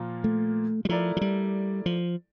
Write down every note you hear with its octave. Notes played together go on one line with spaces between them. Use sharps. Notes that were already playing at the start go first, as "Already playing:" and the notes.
Already playing: A#2 F3 A#3 F4
A3
G3
F3 A3 E4 A#4 D5
F3
G3
F3